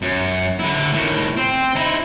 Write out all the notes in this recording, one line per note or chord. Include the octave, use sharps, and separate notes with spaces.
F#2
D3 E4
A2 D#3
C4
D#4 E4